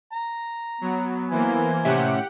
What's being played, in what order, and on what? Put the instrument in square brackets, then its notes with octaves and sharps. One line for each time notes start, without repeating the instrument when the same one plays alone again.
[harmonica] A#5
[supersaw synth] F#3 [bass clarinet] B3
[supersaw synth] E3 A#3 [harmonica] C5 G#5
[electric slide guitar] A2 C#4 E5 [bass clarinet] C3 [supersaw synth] G4 F#5